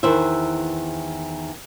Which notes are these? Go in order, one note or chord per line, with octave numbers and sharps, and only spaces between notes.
E2 D#3 B4 C5 E5